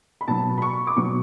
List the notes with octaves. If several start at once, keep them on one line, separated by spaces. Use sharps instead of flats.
B5
B2 F#3 A5
B5
C#6
D6
B2 F#3 C#6